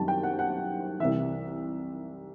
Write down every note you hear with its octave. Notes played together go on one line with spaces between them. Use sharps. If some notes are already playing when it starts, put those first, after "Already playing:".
Already playing: F#2 D#3 G3 C4 A5
G5
F#5
F#5
C2 C3 E3 E5